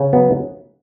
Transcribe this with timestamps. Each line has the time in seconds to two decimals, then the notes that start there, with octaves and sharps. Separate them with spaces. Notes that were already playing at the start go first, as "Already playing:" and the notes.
Already playing: C#3
0.13 F#3 B3